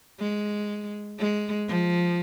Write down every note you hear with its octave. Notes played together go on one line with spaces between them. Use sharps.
G#3
G#3
F3